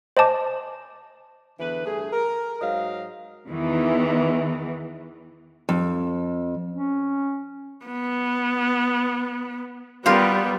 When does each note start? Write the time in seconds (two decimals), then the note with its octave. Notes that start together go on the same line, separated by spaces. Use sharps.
0.17 C5 D#5 G#5 A5 D6
1.59 E2 D3 E3 B4
1.85 G2 A3 G#4
2.12 A#4
2.61 G#2 F#3 D#5 F5
3.48 E2 D#3 E3
5.69 F2
6.71 C#4
7.86 B3
10.06 G3 B3 F4 G4 A#4